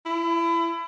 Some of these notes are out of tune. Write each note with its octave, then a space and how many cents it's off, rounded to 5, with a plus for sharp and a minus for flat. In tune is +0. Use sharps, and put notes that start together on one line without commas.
E4 +30